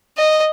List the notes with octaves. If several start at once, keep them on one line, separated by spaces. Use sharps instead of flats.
D#5